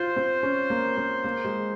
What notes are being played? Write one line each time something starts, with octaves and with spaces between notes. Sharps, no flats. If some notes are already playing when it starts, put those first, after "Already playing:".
Already playing: F4 C5
C4
C#4
A#3
C4
A#3
G#3